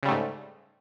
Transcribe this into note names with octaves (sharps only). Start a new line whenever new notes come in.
G#2 C#3 G3 A3